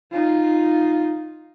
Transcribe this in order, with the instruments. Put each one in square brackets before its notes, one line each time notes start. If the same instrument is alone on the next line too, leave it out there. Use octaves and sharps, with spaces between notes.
[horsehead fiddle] D#4 F4